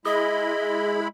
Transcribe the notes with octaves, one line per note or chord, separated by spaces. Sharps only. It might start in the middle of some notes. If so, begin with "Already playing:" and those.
G#3 E4 G#4 D#5 B5